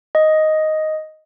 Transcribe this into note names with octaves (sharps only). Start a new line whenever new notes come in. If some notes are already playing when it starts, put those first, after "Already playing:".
D#5